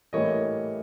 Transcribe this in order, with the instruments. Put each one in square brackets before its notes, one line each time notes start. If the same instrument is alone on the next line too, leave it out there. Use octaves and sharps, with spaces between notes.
[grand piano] A2 E3 G3 A#3 C#5 D#5